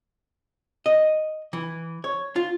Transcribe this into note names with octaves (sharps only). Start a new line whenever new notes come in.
D#5
E3
C#5
F4